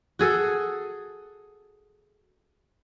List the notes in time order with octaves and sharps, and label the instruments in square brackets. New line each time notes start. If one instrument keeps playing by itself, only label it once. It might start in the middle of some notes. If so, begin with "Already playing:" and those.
[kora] F#4 G#4 A4